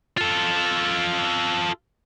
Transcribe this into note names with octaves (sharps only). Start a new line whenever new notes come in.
F4 A4